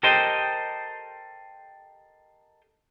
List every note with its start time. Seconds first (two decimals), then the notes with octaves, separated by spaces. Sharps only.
0.03 G4 A4 A#4 C5 D#5 G5